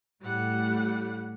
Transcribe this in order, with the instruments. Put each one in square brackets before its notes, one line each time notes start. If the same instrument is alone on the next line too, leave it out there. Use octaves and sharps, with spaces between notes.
[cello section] A2 [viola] G3 F#5